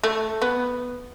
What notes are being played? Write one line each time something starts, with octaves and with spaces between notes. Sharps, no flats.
A3
B3